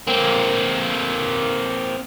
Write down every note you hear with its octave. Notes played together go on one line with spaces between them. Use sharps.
A#3 C4